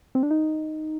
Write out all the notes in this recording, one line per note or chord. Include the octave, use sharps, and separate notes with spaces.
C4
D4
D#4